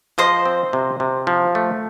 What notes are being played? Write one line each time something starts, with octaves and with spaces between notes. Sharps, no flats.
F3 C5 D#5
C4
C3
C3
F3
A3